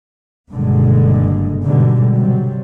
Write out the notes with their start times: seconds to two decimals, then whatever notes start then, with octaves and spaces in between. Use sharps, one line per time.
0.52 F#1 G2 B2 D3 G#3
1.64 G#2 B2 D3 G3 G#3
2.15 C3 F#3 G3